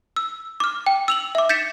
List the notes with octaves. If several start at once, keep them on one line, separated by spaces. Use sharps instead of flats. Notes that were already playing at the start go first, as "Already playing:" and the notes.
E6
D6 F6
G5
E6 F7 F#7
E5 D6
G6 A6 B6 C#7 E7